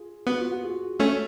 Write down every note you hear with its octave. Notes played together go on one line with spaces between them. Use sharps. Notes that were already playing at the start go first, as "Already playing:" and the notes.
Already playing: F4 G#4
B3 F#4
F4
F#4
F4 G#4
A3 C#4 F#4 A4